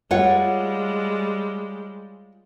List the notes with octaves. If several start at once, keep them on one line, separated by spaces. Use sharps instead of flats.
G3 G#3 F4 C#5 F#5